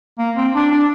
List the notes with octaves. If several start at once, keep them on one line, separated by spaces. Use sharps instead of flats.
A#3
C4
D4
D4